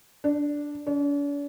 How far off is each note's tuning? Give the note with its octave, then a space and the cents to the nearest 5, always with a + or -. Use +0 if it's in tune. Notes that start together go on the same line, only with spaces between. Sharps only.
D4 -5
D4 -45